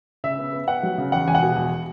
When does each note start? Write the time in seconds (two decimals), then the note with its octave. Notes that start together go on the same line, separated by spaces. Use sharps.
0.24 C#3 E5
0.38 B3
0.53 B3
0.68 B3 F#5
0.83 F#3
0.98 C#3
1.12 E2 F#5
1.28 E1 G#5
1.35 F#5
1.42 B2
1.57 E2